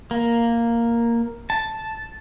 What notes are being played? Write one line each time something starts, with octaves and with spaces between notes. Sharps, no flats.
A#3
A5